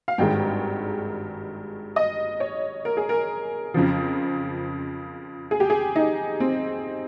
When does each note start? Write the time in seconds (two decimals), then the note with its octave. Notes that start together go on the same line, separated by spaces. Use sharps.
0.08 F5
0.18 G#1 G2 D#3 G#3 G5
1.96 D#5
2.40 C#5
2.85 A#4
2.97 G#4
3.09 A#4
3.74 F2 C#3 F3
5.51 G#4
5.60 G4
5.70 G#4
5.96 D#4
6.40 C4